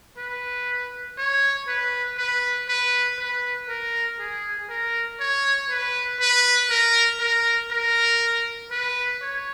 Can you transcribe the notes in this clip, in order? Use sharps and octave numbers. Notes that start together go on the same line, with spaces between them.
B4
C#5
B4
B4
B4
B4
A#4
G#4
A#4
C#5
B4
B4
A#4
A#4
A#4
B4
C#5